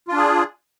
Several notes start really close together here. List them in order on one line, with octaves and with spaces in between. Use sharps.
F4 D4 G#4